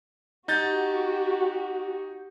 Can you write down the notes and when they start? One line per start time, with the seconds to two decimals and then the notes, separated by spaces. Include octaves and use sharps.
0.48 D#4 F#4 G4 G6 A6